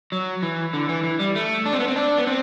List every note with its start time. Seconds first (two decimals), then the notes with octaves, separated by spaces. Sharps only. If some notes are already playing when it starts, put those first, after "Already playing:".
0.12 F#3
0.43 E3
0.73 D3
0.89 E3
1.04 E3
1.19 G3
1.35 A3
1.66 D4
1.73 C4
1.80 B3
1.88 C4
1.96 D4
2.18 B3
2.27 C4